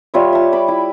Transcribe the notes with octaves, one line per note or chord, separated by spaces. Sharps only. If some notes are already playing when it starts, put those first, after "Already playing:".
G3 F4 C#5 E5
E5 A5
B5 D6
E4